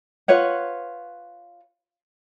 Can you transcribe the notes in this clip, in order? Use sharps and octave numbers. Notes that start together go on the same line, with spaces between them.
F4 B4 C#5 F#5